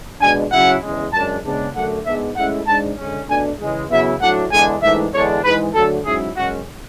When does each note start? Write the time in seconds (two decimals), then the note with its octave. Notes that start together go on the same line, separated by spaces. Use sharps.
0.21 B2 G#3 D4 G#5
0.52 C#3 F#3 C#4 E4 F#5
0.82 E2 C#3 G#3
1.13 F#2 C#3 G#3 D4 A5
1.44 C#3 G#3 B3 D4
1.74 F#2 D3 A3 D4 F#5
2.06 G#2 G#3 B3 D4 E5
2.36 A2 G#3 C#4 E4 F#5
2.67 G#2 G#3 D4 A5
2.97 D3 G#3 C#4
3.28 B2 A3 D4 G#5
3.59 C#3 E3 G#3
3.90 C#3 F#3 B3 E4 E5
4.21 A2 F#3 A3 D4 F#5
4.51 E2 D3 G#3 D4 G#5
4.82 G#2 E3 A3 D4 E5
5.13 E2 D3 G#3 D4 C#5
5.44 G#2 E3 G#3 B4
5.74 D3 F#3 A3 A4
6.05 G#2 F#3 C#4 E4 G#4
6.36 F#2 C#3 G#3 C#4 F#4